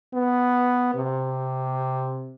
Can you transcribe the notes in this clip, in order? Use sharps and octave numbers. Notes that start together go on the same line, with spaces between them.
B3
C3